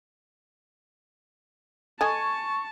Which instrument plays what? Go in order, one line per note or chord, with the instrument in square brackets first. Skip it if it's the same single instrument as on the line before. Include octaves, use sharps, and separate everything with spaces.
[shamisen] A4 D#5 [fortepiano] G#5 [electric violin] A5 [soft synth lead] C#6